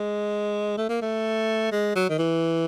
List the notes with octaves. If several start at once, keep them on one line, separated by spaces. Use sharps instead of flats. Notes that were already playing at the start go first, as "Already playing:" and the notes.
Already playing: G#3
A3
A#3
A3
G#3
F#3
D#3
E3